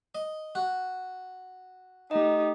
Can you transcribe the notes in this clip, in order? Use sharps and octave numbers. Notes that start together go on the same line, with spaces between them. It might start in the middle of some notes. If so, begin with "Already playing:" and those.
D#5
F#4
A3 D#4 G4 D#5